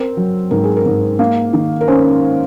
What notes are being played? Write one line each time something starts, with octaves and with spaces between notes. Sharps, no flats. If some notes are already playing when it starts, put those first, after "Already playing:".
Already playing: C4 A#4
F#3
G#2 A#4
G#4
A#4
G#2
A#3
D#3
A#4
C#4 C5